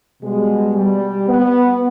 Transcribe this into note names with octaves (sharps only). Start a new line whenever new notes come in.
B2 G3 G#3
G3
B3